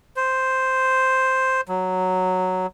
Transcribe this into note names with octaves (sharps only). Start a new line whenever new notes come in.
C5
F#3